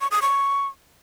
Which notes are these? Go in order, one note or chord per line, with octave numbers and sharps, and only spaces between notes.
C#6
D#6
C#6